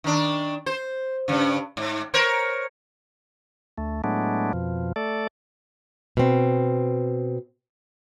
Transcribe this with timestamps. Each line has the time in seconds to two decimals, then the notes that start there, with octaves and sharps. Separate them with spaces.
0.04 D#3 D4
0.66 C5
1.28 G2 C#3
1.77 G#2
2.14 A#4 C5 C#5
3.78 D2 A3
4.04 A2 F#3 G#3 A3 B3 D4
4.53 F2 B2 F3
4.96 A3 A4 D5
6.17 B2 C4